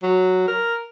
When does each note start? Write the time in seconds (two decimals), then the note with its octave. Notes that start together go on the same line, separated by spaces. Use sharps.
0.03 F#3
0.48 A#4